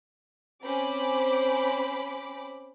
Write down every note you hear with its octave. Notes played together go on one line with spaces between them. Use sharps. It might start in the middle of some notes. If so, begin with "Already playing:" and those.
C4 C#4 C5 B5 D6